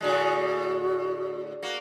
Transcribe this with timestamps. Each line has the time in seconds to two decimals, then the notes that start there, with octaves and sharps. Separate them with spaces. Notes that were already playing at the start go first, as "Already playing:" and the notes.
0.01 A2 D3 G#3 F#4
1.63 A#3 F#4